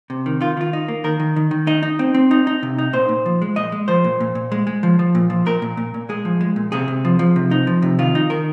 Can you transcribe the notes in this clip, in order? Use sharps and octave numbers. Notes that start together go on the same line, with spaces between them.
C3
D#3
D#3 F4
D#3 F4
D#4
A#3
D#3 A#4
D#3
D#3
D#3
D#4 D#5
D#4
C4
C4
D#4
D#4
C3
D#4
A#2 C5
A#2
F3
G#3
A#2 D#5
G#3
F3 C5
A#2
A#2
A#2
G#3
G#3
F3
F3
A#2
F3
A#2 A#4
A#2
A#2
A#2
G#3 G#4
F3
G#3
A#2
C3 G#4
C3
F3
F3
C3
D#4
F3
C3
D#3 F4
D#4
D#3 A#4